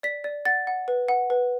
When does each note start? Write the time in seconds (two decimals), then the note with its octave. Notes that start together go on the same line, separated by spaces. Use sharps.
0.03 D5 B6
0.24 D5
0.45 F#5 A6
0.67 F#5
0.88 B4
1.08 F#5
1.30 B4